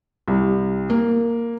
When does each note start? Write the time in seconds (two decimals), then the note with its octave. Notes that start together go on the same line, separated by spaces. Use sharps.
0.28 C2
0.90 A#3